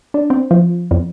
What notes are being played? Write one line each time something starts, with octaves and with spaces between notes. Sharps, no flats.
D4
C4
F3
F2